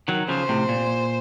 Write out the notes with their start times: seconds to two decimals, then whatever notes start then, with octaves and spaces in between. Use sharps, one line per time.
0.08 D#3 F#3
0.29 C#3 F3 C5
0.49 A2 C3
0.69 A#2